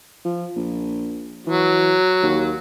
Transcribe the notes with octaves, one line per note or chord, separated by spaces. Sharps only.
F3
A#1
E3 F#3
D#2